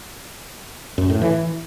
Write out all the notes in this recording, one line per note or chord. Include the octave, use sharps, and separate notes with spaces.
F#2
A2
E3